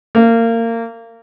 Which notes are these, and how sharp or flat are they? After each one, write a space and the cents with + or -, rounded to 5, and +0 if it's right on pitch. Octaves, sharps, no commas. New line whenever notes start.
A#3 -25